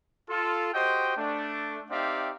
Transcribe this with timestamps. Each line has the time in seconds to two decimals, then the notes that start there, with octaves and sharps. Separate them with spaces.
0.30 F4 A4
0.74 F#4 G4 C5 D#5 G5
1.17 A3 D4
1.91 C4 D#4 G4 D5 E5 F5